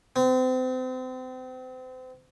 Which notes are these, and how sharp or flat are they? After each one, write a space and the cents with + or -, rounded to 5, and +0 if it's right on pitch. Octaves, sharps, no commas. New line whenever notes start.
C4 -35